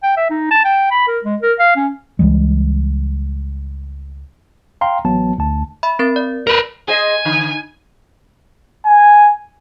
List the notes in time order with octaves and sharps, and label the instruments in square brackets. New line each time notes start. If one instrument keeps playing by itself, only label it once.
[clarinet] G5
E5
D#4
A5
G5
B5
A#4
G#3
A#4
F5
C#4
[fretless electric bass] C#2 E3 G3 G#3
[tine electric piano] F5 G5 A#5 C6
A1 F#3 B3 A5
D2 A5
[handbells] E5 B5
C4 A#4 A6
D5
[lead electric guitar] A#4 B4
[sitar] G#4 C5 D#5 [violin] G#5
[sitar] D3
[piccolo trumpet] G#5